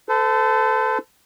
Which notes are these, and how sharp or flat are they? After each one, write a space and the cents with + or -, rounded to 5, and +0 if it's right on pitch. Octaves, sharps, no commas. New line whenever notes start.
A4 +0 C5 -45